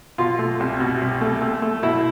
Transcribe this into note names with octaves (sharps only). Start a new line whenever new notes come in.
B2 F4
A3
C2
B2
C2
A3
A3
A3
B2 E4